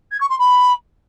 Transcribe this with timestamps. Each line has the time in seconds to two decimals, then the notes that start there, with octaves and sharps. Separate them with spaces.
0.12 G#6
0.21 C#6
0.30 C6
0.39 B5